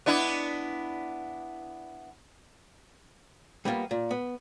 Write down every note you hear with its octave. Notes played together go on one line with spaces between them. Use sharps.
B3 D4 E4
G3 A#3 B3 D4 F4
A#2
B3